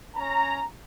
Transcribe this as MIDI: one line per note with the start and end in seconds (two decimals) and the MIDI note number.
0.16 0.61 61
0.16 0.61 82